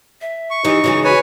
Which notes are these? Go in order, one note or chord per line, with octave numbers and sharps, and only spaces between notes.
E5
C#6
E3 D#4 G4
C#3 E3 G#3 F#4
B4 C#5 G#5